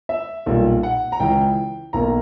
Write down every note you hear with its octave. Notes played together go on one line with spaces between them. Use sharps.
E5
B1 A#2 G3
F#5
A#5
C#2 C#3 E3 G5
B1 B2 A#3 A#5